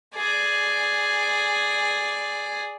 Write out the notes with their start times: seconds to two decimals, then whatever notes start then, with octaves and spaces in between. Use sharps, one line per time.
0.15 G#4 D5